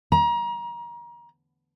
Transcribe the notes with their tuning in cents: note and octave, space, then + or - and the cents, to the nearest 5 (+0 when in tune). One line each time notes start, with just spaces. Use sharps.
A#5 +30